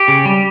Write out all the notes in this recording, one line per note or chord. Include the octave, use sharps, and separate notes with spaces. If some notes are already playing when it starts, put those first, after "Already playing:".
Already playing: G4
C#3
G3